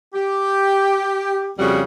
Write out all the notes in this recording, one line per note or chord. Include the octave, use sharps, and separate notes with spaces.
G4
F2 C#3 G3 F#4